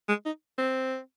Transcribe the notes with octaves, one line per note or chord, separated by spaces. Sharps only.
G#3
D#4
C4